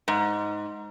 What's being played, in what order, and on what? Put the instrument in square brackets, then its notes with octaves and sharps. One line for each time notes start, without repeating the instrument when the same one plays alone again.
[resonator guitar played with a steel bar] G#2